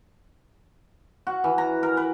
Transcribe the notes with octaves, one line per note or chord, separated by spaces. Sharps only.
F#4
E3
A#5
A#4
B4